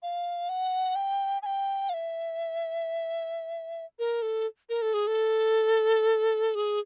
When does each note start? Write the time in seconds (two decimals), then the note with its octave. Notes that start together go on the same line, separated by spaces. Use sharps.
0.03 F5
0.49 F#5
0.96 G5
1.42 G#5
1.46 G5
1.89 F5
1.94 E5
3.99 A#4
4.22 A4
4.69 A#4
4.82 A4
4.94 G#4
5.07 A4
6.55 G#4